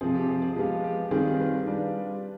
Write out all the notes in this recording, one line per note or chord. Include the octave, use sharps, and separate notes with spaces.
C3 F3 C4 G#4
G4
G#4
G#4
F3 G#3 B3 F4 G4
G4
D#3 G3 C4 F4 G#4
B4
G3 D4 F4